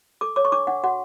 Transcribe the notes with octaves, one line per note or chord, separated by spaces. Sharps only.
A4 D6
C#5 D6
C#6
D4 D6
D4 F#5
F#4 F#5